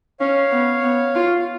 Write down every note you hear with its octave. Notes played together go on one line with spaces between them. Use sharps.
C#4 C#5 F5
B3
B3
F4
F5